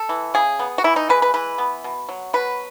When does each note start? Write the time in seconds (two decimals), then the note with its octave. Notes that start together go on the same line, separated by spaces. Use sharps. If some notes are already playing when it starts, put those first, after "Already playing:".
Already playing: A4
0.09 E3
0.34 C#3 G#4
0.59 B3
0.78 F#4
0.84 E3 E4
0.96 D#4
1.09 G#3 B4
1.22 B4
1.34 E3 B4
1.58 B3
1.84 B2
2.09 F#3
2.33 B2 B4